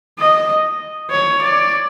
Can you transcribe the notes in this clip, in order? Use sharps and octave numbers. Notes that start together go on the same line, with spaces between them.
D#5
C#5
D5